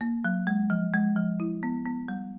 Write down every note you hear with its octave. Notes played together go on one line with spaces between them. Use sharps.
A#3
F#3
G#3
F3
G#3
F3
E4
B3
B3
G3